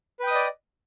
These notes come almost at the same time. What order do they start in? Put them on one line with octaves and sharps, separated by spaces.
B4 G5 D#6 D#5 D5